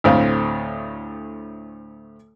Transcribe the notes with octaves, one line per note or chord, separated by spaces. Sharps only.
D2 A2 C4 F5